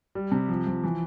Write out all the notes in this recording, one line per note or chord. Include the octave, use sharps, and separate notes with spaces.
G3
C3
F3
F3
E3